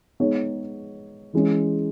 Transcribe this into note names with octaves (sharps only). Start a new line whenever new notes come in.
G#3 B3 D#4 G#4 C#5
E3 G#3 C#4